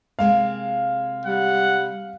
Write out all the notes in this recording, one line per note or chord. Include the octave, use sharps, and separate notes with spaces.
C3 G#3 A#3 F5
G3 F#5